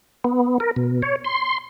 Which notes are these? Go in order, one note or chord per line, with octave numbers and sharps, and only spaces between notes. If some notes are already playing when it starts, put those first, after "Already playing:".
B3
A#4
B2
C#5
C6